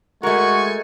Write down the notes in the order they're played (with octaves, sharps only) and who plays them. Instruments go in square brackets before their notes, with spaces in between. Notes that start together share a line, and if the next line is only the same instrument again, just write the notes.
[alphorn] G#3 [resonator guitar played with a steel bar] A3 A#4 [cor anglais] F#4 [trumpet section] G#5 C#6